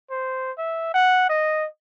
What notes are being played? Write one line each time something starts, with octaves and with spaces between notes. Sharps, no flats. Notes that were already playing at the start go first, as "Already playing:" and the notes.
C5
E5
F#5
D#5